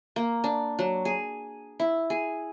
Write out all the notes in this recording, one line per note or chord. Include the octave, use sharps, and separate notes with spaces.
A#3
D4
F#3
G#4
E4
G#4